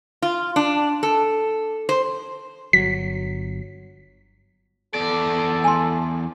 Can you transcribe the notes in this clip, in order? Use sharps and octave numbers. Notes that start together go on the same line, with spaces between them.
F4
D4
A4
C5
G1 F#3 B6
E2 A4 D5
G#5 A5 C6